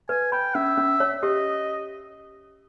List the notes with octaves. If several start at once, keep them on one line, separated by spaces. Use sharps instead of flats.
B4 G#5
G5 B5
C#4 E5
C#4
C#5
G4 D#5